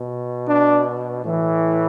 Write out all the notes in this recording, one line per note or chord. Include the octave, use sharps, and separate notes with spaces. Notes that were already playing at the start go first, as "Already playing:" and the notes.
Already playing: B2
D4
A2 E3